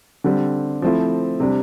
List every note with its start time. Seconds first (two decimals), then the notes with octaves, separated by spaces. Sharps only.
0.24 D3 G3 C4
0.82 F3 A3 C4 E4
1.40 C3 G3 D4